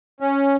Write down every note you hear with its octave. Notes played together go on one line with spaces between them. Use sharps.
C#4